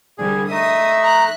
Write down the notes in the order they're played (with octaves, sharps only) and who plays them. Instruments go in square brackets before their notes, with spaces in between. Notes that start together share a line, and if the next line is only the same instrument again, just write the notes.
[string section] C2 D3 G3 [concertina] G#4
[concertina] A3 D#4 D#5 [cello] E5 [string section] D#6
[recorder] A#5 [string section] F#6